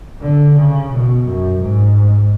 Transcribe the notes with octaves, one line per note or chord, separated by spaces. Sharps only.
D3
C#3
B2
F#2
G#2